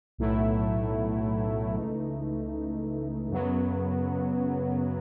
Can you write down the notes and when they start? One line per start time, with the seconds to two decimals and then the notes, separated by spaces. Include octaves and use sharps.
0.18 B1 A2 F#3 A3 E4
1.75 C#2 C#3 E3 A3 D#4
3.30 F#2 C#3 F#3 B3